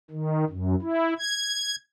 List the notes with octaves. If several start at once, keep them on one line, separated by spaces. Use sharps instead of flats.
D#3
F#2
E4
G#6